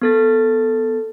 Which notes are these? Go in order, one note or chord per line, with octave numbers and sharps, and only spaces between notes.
B3 A4 A6